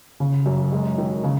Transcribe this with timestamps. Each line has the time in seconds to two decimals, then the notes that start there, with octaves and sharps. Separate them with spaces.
0.20 C#3
0.46 F#2
0.72 G#3
0.98 D#3
1.24 C#3